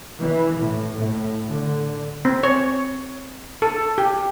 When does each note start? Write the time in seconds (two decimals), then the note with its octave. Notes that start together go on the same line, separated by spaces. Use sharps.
0.20 E3
0.58 A2
0.96 A2
1.46 D3
2.25 C4
2.43 C#5
3.62 A4
3.98 G4